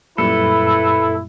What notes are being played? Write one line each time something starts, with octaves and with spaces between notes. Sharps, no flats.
F#2 A#2 G3 E4 A4 B4